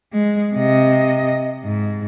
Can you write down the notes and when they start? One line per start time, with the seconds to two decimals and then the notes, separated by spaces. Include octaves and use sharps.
0.13 G#3
0.55 C3 D#5
1.64 G#2